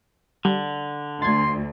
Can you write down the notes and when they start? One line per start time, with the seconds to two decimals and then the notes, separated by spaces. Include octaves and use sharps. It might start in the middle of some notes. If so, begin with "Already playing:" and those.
0.45 D3 G3
1.22 D2 C6 G#6 A6